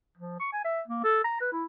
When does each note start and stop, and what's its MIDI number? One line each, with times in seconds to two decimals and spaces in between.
0.18 0.39 53
0.40 0.48 85
0.53 0.60 80
0.64 0.81 76
0.88 1.03 58
1.04 1.21 69
1.24 1.38 82
1.41 1.51 71
1.53 1.65 64